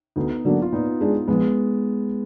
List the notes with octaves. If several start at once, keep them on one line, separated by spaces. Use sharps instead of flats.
D2 B3 D#4
D3 F#3 A#3 D4
F4
A#2 B3 D#4
G#3 D4 F4 G#4
A#1 G#3 B3